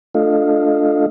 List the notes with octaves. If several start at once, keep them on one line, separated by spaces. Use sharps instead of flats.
A3 D4 F4 A4 D#5 F5